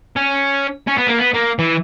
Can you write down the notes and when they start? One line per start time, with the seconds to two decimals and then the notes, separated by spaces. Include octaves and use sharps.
0.16 C#4
0.88 C#4
0.98 B3
1.08 A#3
1.19 B3
1.34 A#3
1.59 E3